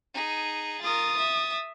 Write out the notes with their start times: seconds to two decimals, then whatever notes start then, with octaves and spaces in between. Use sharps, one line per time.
0.14 D#4 G#4
0.81 F4 A#4 D#6 A6
1.17 E5